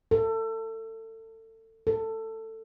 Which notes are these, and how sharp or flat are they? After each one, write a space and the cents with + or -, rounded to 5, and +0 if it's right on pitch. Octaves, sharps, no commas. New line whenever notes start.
A4 +30
A4 +20